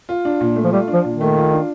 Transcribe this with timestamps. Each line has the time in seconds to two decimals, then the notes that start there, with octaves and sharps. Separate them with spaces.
0.09 F4
0.25 D4
0.41 A#2
0.56 A3
0.64 F3
0.73 G3 F4
0.88 D4
0.94 F3
1.04 A#2
1.15 D#3
1.21 A3
1.36 F4
1.52 D4